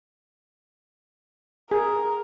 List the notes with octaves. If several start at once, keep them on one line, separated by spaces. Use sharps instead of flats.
G#4 A#4